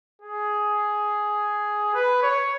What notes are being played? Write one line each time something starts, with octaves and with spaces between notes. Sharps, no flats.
G#4
B4
C#5